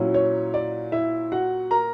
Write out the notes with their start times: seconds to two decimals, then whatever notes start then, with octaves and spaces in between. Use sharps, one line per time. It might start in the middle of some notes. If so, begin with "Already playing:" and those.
Already playing: A#2 F#3 C#4 E4
0.14 C#5
0.54 D5
0.92 E4 E5
1.32 F#4 F#5
1.71 A#4 A#5